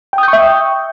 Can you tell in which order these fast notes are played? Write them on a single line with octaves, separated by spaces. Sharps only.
G5 D#6 G6 C#6 E5